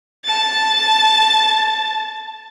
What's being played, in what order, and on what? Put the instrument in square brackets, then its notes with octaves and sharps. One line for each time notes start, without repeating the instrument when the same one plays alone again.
[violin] A5 A6